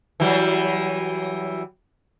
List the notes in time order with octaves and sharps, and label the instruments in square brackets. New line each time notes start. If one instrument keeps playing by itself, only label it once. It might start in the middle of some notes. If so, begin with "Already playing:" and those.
[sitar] E3 F#3 G3